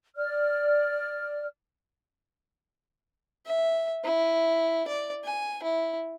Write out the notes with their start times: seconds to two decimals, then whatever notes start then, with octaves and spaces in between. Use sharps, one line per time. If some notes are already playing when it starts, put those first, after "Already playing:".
0.16 D5 F6
3.46 E5
4.04 E4
4.88 D5
5.24 G#5
5.63 E4